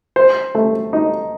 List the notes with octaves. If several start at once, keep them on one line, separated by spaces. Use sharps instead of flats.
C5
A3
D#4